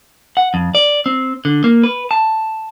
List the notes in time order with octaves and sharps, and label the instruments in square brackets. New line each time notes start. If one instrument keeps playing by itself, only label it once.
[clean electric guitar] F#5
F2
D5
C4
D3
A#3
B4
A5